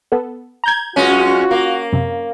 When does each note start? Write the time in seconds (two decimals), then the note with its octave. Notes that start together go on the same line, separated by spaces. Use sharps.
0.12 B3 A4
0.64 A#5 G6 G#6
0.96 F#2 G#3 C#4 F4 F#4
1.51 A#3
1.93 F#2 C3